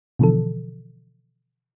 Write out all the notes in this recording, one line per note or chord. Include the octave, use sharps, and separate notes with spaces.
B2 D3 E3 F3 A4